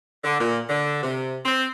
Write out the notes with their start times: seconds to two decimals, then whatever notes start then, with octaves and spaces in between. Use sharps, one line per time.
0.24 D3
0.40 A#2
0.70 D3
1.03 C3
1.45 C4